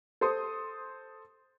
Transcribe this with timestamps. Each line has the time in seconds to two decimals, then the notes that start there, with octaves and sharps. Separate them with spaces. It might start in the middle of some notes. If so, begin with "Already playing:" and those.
0.21 A4 C5 C6 D#6